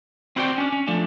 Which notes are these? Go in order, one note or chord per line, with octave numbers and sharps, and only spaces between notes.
C4 E4 F#4 C5 D5 G5
C#4 D4
C#4
F3 A3 D4